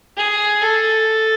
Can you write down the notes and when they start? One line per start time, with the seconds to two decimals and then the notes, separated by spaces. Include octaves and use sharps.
0.17 G#4
0.63 A4